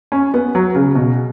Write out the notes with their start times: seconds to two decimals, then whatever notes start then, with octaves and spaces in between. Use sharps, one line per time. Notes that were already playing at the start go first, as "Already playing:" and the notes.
0.12 C#4
0.34 B3
0.55 F#3
0.75 C#3
0.95 B2